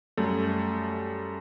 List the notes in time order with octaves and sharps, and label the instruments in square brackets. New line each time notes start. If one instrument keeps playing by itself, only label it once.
[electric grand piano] F#2 G3 A3